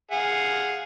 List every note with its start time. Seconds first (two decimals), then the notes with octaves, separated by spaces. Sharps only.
0.12 G#4 F5 F#5